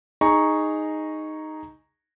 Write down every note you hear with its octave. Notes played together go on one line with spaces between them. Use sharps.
D#4 G#4 A#5 C#6